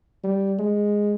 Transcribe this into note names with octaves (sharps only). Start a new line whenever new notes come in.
G3
G#3